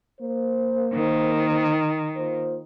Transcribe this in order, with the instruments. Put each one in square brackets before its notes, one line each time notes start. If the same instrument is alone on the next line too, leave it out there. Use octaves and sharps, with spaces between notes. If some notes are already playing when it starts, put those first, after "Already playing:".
[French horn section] A#3 C5
[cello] D#3
[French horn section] A#3 F4 C5